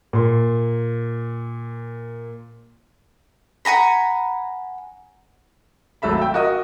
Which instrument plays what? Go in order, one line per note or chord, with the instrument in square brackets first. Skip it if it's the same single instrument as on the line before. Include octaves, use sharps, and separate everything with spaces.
[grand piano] A#2 C6
[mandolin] F#5 G#5 A#5 B5
[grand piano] G#1 F#3 A3 E5 B5
E5 G5
F#4 A#4 D#5 D#6